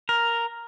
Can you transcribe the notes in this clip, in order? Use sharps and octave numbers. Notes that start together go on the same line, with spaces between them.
A#4